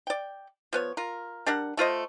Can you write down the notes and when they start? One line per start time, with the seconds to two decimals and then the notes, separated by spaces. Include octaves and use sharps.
0.07 D5 G5
0.73 F3 B3 C#5
0.97 F4 A#4
1.46 G3 D4 A#4 F#5
1.77 A3 F4 C5 D#5